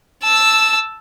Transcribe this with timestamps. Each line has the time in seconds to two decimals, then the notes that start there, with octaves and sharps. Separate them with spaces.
0.23 A5 E6